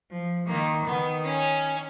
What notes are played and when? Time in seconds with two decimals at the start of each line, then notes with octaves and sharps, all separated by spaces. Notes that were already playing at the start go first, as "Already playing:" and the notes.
0.09 F3
0.47 D#3 A#3
0.85 D#3 B3
1.24 C#4